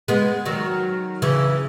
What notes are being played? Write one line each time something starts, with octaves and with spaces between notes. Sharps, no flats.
G#3 B3
D#3 F#3
C#3 E3